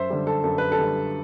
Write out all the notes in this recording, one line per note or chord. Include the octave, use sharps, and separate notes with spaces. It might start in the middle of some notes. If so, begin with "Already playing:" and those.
Already playing: F#2 C5 E5
D3 G3
A4
F#2 A4
B4
A4
D3 G3